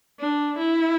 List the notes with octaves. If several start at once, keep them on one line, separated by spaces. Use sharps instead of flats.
D4
E4